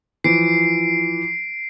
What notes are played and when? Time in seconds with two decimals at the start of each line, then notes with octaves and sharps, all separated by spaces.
0.24 E3 F3 C7 D7